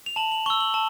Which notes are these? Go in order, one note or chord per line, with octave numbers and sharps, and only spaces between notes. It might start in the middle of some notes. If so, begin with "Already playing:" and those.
F7
A5 F#7
F#7
C#6 E6 G7
F#7
A5